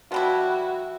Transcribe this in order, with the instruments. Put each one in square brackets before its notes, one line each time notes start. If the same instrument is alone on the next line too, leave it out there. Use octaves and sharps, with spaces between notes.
[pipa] F3 G3 E4 [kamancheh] F#4